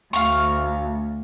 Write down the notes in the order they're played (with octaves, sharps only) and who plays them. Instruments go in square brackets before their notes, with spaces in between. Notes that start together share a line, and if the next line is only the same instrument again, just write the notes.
[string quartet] D2 [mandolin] F5 C#6